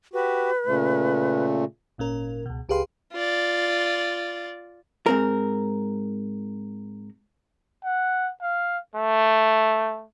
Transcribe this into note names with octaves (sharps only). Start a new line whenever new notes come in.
F#4 G4 B4
A#2 C#3 A3
G#1 A#2 C#4 A#4
C#2 B2
C#2 G4 G#4 B4 F5 C6
F4 D5
G#2 C4 A#4
F#5
F5
A3